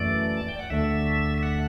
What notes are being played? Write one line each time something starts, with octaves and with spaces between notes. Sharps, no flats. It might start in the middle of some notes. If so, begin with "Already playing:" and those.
Already playing: F#2 E3 A3 D5
A5
G5
F#5
D2 D3 A3 E5
E5
F#5